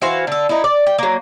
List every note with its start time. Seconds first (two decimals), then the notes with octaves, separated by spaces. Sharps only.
0.02 E3 F#4 C5 F5
0.27 D3 A4
0.49 D#4 E4
0.64 D5
0.87 G5
0.98 F#3 A#3